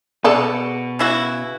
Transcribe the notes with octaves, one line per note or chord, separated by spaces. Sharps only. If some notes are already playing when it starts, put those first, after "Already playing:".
B2 B3 G#4 A4 D5
C#3 E4 F#4